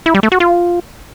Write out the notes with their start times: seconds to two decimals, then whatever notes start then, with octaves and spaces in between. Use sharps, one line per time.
0.06 E4
0.14 G3
0.23 A3
0.32 F#4
0.40 F4